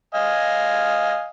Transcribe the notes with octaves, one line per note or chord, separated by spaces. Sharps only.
D#5 F5 G#5